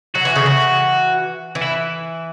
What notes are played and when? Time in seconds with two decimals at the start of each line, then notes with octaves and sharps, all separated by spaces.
0.15 F#3 F#4
0.25 E3
0.36 C#3
0.46 E3
1.55 E3
1.62 E4